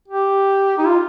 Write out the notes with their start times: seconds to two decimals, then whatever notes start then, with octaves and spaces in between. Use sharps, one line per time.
0.08 G4
0.78 D#4
0.87 F4